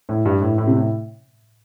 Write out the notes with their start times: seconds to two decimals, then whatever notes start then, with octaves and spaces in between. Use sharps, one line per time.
0.09 A2
0.25 G2
0.41 A2
0.58 A2
0.67 C3
0.76 A2